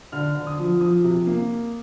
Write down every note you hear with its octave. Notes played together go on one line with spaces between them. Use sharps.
D3 F6
D3
D#6
F3
F3 D#6
C3
A#3